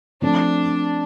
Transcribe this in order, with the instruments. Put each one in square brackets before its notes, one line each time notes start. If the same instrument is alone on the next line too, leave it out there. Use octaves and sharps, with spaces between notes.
[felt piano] F3 A3 C4 [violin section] D4